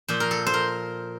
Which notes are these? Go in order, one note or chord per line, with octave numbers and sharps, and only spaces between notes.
A#2 F3 C5
A#4
A4
C5
A#4